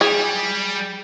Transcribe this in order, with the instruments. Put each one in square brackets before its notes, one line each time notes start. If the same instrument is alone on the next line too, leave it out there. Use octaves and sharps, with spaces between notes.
[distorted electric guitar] G3 [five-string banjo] G#4